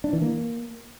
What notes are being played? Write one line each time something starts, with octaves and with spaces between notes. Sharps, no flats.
D4
E3
A#3